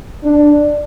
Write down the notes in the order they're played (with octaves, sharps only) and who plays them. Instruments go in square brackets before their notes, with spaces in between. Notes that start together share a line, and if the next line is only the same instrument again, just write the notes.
[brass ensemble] D4